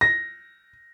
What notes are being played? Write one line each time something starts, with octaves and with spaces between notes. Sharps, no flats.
A#6